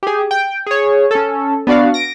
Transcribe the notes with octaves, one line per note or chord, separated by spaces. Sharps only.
G4 G#4
G5
G#4 C#5
C#4 A4
B3 D4 F#4 D5 F5
A#6 D7